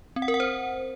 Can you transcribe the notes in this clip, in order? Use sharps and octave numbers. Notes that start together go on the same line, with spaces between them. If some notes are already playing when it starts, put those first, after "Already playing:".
C4
F#5
A#4
F#5
C5